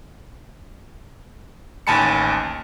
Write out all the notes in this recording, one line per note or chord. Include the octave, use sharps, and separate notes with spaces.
A1 D#2 G#5 A5 B5 C#7